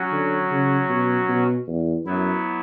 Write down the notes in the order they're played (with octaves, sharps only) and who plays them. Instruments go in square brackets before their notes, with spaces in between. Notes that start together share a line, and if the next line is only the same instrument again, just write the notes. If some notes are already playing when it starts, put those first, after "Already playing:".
Already playing: [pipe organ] F#3 C#4 F#4
[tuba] D3
C#3
B2
B2
E2
[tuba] F#2 [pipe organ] F#3 B3 E4